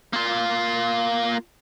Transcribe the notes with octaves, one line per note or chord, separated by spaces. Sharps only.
A#3 F4